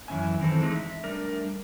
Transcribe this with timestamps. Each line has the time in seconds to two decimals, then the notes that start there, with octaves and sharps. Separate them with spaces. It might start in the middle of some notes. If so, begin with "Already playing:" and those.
0.08 F#2 E3 G3 C#4 E5 G#5
0.39 D#3 E3 C4 A4
0.59 E3 G#3 A3 D#4
0.75 E5
1.04 G3 A3 D4 A#4